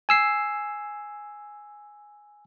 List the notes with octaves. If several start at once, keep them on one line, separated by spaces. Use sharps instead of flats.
G#5 E6 C7